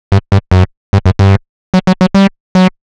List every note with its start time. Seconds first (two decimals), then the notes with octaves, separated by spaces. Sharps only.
0.12 G2
0.32 G2
0.51 F#2
0.93 G2
1.06 F#2
1.19 G2
1.74 F#3
1.87 F#3
2.01 F#3
2.15 G3
2.55 F#3